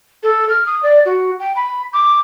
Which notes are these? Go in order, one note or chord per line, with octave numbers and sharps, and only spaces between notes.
A4
F6
D#6
D5
F#4
G5
B5
D6